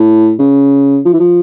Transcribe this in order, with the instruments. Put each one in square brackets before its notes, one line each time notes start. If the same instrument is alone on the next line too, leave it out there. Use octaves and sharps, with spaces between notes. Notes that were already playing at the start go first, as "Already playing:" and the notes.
Already playing: [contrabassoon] A2
C#3
F3
E3
F3